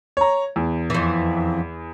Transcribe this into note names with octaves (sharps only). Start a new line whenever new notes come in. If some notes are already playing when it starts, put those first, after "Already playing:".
C#5 A#5
E2
F2 E3